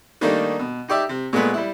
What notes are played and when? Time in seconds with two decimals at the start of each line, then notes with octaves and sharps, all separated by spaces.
0.21 D#3 G3 A3 A#3 D4 D#4
0.59 B2
0.88 D#4 G4 D5 E5
1.09 C3
1.33 A#2 G#3 A3 B3 B5
1.54 G3 E4